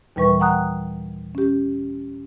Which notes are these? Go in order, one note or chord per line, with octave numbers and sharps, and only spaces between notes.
D#2 A#2 E3 G3 B4 C#6
F#5 G5 A#5 D#6 F#6
C#4 G4